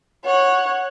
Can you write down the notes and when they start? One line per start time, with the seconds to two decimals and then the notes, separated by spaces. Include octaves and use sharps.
0.24 C#5 F#5